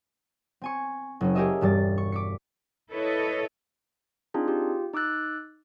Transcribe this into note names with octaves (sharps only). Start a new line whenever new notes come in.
C4 G#5 C#6
F#1 C#4
G4 G#4 A#4 C#5 D#5 E5
E1 G2 G3 A6
C#6
D6 B6 C#7
E4 A4 B4 C#5 D#5
C4 D4 D#4 F4 G#4
F4 G4
D#4 D6 E6 F#6 A6